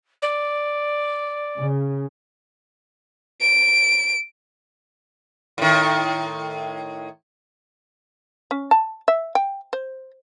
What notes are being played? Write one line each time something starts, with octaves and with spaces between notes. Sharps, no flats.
D5
C#3
D7
A2 D#3
C#4
A5
E5
G5
C5